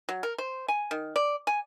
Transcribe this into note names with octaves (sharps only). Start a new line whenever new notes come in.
F#3
A#4
C5
G#5
D#3
D5
G#5